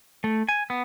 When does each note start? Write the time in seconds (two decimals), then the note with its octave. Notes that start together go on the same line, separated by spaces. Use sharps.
0.24 A3
0.49 G#5
0.70 B3